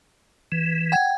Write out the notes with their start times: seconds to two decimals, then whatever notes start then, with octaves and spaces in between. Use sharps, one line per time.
0.52 E3
0.92 F#5 G5 G#6